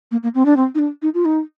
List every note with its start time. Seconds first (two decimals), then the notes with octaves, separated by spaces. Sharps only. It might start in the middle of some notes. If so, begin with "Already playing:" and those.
0.11 A#3
0.23 A#3
0.34 C4
0.45 D4
0.56 C4
0.75 D#4
0.79 D4
1.02 D#4
1.14 F4
1.25 D#4